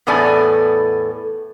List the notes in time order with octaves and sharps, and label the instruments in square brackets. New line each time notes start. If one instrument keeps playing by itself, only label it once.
[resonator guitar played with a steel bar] E2 A2 B3 A4 D5 G#5